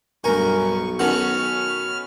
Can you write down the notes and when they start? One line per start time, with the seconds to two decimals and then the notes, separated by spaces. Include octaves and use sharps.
0.24 B1 G2 A#4 G#5 C#6
0.99 D#3 B3 C#4 F#4 A4 F6